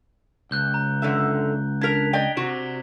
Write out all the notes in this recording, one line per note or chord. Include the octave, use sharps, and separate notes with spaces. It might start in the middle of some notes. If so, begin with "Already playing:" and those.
C#2 F#6 G6 G7
A#5
F#2 D3 E5
D4 A#4 G#6 B6 F7
D5 D#5 G5
C3 F#4